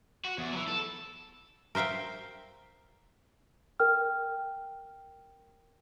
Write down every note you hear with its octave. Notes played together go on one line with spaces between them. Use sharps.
F#4
E2
E3 F#3
A4
A#4 C5 E5 F5 G5
A#4 G5 F6